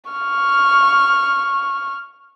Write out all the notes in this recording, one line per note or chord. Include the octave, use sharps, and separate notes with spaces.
C#6 F6